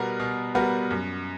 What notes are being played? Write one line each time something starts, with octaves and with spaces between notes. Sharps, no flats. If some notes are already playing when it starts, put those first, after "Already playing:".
Already playing: B2 G3 B3 F#4 A#4
B2
G3 B3 F#4 A#4
F#2